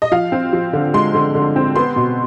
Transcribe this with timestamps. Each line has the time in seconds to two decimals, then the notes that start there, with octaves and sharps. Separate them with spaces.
0.02 D#5
0.12 F3 F5
0.32 C4
0.53 F3
0.73 D3
0.94 G#3 C6
1.14 D3
1.35 D3
1.56 C4
1.76 B3 C6
1.96 B2